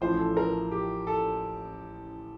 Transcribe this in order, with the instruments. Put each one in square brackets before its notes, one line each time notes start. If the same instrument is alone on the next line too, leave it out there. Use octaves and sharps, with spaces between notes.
[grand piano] A1 A2 F3 C5
A4
A#4
G4
A4